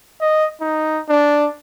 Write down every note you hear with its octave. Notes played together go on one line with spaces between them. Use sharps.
D#5
D#4
D4